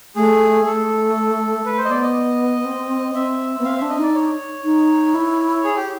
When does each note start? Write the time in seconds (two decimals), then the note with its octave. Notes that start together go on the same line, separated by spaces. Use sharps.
0.16 A3 G#4
0.65 A3 A4
1.65 A3 B4
1.78 C5
1.85 D#5
1.90 B3 D5
2.02 D#5
2.65 C4
3.15 C4 E5
3.59 B3
3.65 C4 F5
3.77 D4 E5
3.90 D#5
3.98 D#4 D5
4.15 C#5
4.64 D#4
5.14 E4
5.64 G#4
5.77 G4